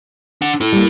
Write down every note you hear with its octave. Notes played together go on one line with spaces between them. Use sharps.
D4 F#5
E4 A4
G3 A#3